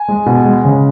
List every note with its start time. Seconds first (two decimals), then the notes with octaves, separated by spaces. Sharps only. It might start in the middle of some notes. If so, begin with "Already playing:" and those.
Already playing: G#5
0.08 G#3
0.26 B2
0.45 G#3
0.65 C#3